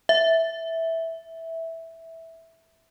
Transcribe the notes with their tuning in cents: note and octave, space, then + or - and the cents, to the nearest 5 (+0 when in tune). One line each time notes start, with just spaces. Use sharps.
E5 -10